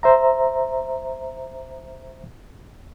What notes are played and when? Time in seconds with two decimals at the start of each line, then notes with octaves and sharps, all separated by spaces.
0.03 C5 E5 A#5